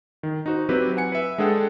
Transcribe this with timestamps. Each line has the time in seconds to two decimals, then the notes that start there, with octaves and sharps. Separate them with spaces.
0.23 D#3
0.46 D#4 F#4 C5
0.69 F#3 C4 E4 G4 B4
0.97 F#5 G#5 C#7
1.12 B4 E5
1.38 G#3 D4 G#4 A4 F#5 G5